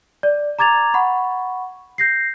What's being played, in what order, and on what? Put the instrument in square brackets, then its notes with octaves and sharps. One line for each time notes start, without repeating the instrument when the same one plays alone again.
[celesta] D5
A#5 D6 G#6 A6 F7
F#5 B5 C#6
G6 A#6 C7